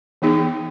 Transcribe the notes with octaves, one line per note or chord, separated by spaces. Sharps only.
E3 B3 D#4 G#4